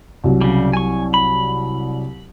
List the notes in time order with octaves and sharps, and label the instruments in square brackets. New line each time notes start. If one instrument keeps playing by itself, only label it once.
[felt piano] C2 F#3
[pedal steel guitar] C#3 G3
G#5 C#6
B5